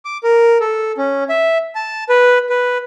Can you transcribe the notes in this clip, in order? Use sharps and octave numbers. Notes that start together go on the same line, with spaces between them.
D6
A#4
A4
C#4
E5
A5
B4
B4